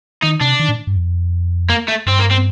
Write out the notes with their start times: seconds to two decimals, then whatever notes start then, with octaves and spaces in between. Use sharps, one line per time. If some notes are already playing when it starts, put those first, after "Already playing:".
0.23 D#3 D#4
0.41 C3 D4
0.59 D#3
0.69 A2
0.87 G2
0.96 F2
1.70 A#3
1.88 A3
2.06 G2 C4
2.19 A#3
2.31 C4